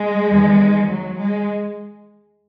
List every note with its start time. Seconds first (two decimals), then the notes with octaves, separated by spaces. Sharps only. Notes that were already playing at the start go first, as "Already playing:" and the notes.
Already playing: G#3
0.27 E2 D#3
0.87 F#3
1.18 G#3